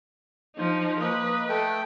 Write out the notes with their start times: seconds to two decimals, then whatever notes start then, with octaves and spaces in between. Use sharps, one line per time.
0.56 F3 D#4
1.00 A#3 B4 D#5
1.49 A3 A4 G5